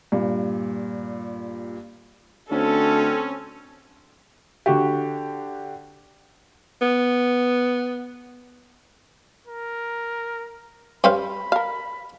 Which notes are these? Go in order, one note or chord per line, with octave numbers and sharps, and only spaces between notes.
G2 A#2
D2 C4 C#4 A4
D3 F#4 G4
B3
A#4
G2 G3 C#4 C5 F5 B5
A#4 F5